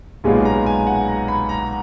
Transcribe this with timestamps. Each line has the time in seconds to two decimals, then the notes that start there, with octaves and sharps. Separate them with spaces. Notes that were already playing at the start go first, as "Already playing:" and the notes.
0.24 B1 A#2 G#3 B3 F4 G#5
0.45 A#5
0.66 G#5
0.87 F#5
1.08 A#5
1.28 B5
1.49 A#5